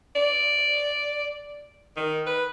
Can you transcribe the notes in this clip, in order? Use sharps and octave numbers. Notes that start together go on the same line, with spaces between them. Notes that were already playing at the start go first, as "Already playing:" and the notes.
D5
D#3
B4